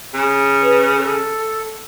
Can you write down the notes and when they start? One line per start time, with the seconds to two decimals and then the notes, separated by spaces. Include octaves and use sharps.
0.14 C#3
0.62 B4
0.97 A4